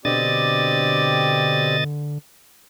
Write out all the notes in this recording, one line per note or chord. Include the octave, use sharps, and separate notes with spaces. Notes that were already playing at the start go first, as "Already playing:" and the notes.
B2 D3 C4 G4 D5 D#5 A6